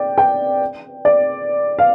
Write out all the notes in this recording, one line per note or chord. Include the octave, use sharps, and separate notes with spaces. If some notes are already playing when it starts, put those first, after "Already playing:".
Already playing: D5 G5
G5
D5
F5